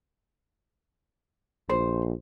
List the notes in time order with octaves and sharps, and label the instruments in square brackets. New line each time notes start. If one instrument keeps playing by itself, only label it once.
[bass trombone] A#1 [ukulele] C5